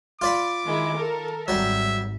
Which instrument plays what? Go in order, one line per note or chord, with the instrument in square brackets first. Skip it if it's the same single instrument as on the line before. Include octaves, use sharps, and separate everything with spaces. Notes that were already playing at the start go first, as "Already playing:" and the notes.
[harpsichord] F4 D5 B5 [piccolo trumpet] D6
[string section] D#3 G#3 E4
A4 A#4
[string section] G#1 [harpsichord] F#3 G3 [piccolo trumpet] E5